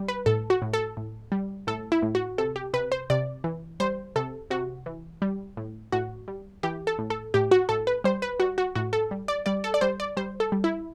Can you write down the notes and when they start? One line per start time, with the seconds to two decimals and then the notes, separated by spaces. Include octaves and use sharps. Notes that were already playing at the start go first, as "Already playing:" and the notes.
Already playing: G3
0.08 B4
0.26 A2 A4
0.50 F#4
0.62 A2
0.73 A4
0.97 A2
1.32 G3
1.67 A2 A4
1.92 E4
2.03 A2
2.15 F#4
2.38 C3 A4
2.56 G4
2.74 C3 B4
2.92 C5
3.10 C3 D5
3.44 E3
3.80 G3 C5
4.16 C3 A4
4.50 C3 F#4
4.86 E3
5.22 G3
5.57 A2
5.92 A2 F#4
6.28 G3
6.63 E3 G4
6.87 A4
6.99 A2
7.10 A4
7.34 A2 G4
7.51 F#4
7.69 A2 A4
7.87 B4
8.04 G3 C5
8.22 B4
8.40 G3 F#4
8.58 F#4
8.75 A2 F#4
8.93 A4
9.11 G3
9.28 D5
9.46 G3 D5
9.64 A4
9.74 D5
9.81 G3 C5
10.00 D5
10.17 G3 C5
10.40 A4
10.52 G3
10.64 E4